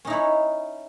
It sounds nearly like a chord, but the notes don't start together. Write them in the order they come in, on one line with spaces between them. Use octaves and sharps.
C#4 D#4 E4 C#5